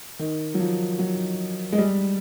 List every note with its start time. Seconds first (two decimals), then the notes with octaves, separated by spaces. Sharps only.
0.19 D#3
0.54 F#3
0.59 F3
0.99 F#3
1.72 G#3
1.78 G3